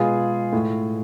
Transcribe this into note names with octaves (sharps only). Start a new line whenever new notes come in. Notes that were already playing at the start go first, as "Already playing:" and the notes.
Already playing: B2 G#3 B3 F4 G#4
A2